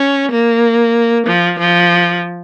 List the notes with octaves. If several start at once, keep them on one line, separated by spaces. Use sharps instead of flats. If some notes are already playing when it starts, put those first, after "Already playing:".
Already playing: C#4
A#3
F3
F3